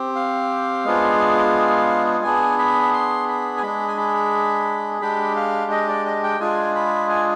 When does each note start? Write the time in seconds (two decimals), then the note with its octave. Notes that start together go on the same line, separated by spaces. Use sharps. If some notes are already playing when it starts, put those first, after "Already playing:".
Already playing: C4 G4
0.15 F5
0.85 G#3 B3 D4 F4 G#4
2.24 B3 D4 G#4 G#5
2.59 B5
2.93 C6
3.28 B5
3.57 G#5
3.62 G#3 D4 G#4 B5
3.88 G#5
3.97 B5
5.01 G#3 D4 G4 B5
5.36 F5
5.71 D#5
5.88 D5
6.06 D#5
6.23 G5
6.40 G#3 D4 F4 G#4 G#5
6.76 B5
7.10 G#5